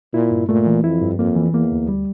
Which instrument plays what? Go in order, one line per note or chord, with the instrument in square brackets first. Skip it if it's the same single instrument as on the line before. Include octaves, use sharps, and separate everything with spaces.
[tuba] A#2 [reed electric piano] E4
[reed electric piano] G2
[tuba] A#2 [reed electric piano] A3
[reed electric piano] E3
[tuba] F2 [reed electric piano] E4
[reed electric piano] G2
[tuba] F2 [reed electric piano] A#3
[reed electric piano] E3
[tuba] E2 [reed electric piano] A#3
[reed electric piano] D2
G3